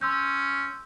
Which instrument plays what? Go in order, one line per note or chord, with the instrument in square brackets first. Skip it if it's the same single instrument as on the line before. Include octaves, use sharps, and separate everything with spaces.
[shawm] C#4 [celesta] C6 E6 G6